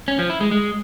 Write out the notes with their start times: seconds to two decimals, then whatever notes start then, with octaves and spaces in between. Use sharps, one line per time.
0.08 C#4
0.19 F3
0.30 E4
0.41 G#3
0.51 G#3